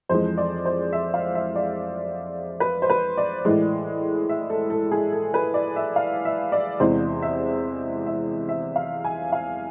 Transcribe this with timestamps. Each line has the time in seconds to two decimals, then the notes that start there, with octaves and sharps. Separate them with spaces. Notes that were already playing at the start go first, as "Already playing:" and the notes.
0.09 F2 E3 G#3 C5
0.38 D5
0.66 C5
0.93 E5
1.14 F5
1.35 E5
1.56 D5
2.60 B4
2.82 C5
2.90 B4
3.18 D5
3.45 A2 E3 G#3
4.29 E5
4.50 A4
4.70 A4
4.92 G#4
5.13 A4
5.34 B4
5.54 D5
5.76 E5
5.96 F5
6.25 E5
6.52 D5
6.80 E2 C3 E3 G#3 C5
7.22 E5
8.06 E5
8.49 E5
8.76 F5
9.05 G#5
9.32 F5